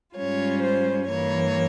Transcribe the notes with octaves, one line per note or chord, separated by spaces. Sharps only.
G#2 G3 C#4 F4 C#5
C5
G2 E3 A#3 C#5